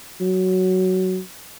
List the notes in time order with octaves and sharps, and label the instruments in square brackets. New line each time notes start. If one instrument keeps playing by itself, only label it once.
[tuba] F#3